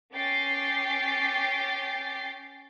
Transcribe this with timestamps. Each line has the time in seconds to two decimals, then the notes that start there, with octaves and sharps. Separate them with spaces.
0.13 C#4 G5 D6 A6 C7